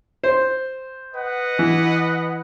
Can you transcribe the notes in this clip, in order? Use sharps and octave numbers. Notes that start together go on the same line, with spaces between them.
C5
B4 D#5 F#5
E3